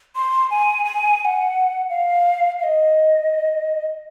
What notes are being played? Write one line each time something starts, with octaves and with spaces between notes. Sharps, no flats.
C6
G#5
G#5
G#5
F#5
F5
F5
D#5